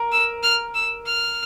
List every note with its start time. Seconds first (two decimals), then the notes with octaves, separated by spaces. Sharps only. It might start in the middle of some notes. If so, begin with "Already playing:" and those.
Already playing: A#4
0.12 E6
0.43 F6
0.75 E6
1.06 F6